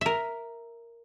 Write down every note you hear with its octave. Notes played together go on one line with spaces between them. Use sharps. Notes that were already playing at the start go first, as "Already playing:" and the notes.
A#4 E5